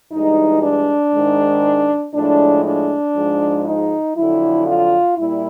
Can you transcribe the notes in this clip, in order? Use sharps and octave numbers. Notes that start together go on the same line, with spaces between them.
G2 E3 G#3 D#4
D4
G#2 D#3 G#3
A2 F3 G#3 D4
D4
G#2 F3 G#3
D#4
F2 D3 F#3 E4
F4
A#2 G3 E4